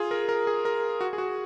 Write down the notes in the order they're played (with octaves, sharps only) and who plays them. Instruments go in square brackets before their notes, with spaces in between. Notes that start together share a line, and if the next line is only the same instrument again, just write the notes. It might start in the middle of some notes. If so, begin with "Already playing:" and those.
Already playing: [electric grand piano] F4 G#4
A#4
A#4
G#4
A#4
F#4
G#4
F#4